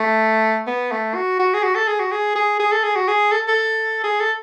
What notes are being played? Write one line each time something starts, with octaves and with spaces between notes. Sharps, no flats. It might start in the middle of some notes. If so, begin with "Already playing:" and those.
Already playing: A3
B3
A3
F#4
F#4
G#4
F#4
A4
G#4
F#4
G#4
G#4
G#4
A4
G#4
F#4
G#4
A4
A4
G#4
A4